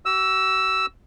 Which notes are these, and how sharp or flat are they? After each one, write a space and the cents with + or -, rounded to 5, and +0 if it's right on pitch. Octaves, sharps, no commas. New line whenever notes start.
F#4 +40 E6 +0